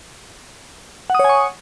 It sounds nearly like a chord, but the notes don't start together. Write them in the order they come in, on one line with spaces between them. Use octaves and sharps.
F#5 D#6 C#5 G#5 C#6